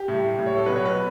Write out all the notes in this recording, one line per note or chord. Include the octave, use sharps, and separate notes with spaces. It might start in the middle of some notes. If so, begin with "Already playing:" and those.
Already playing: G4
A2 G3
A2 G3
C#5
A4
B2 F#3 B4
C#5
B4